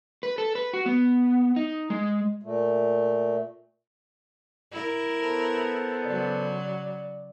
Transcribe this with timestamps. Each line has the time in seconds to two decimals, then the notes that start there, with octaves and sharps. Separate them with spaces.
0.23 B4
0.38 A4
0.55 B4
0.73 F#4
0.86 B3
1.56 D#4
1.90 G#3
2.42 A#2 A3
4.72 E4 A#4
5.19 B3 A4 C5
6.05 C#3 F#3 D5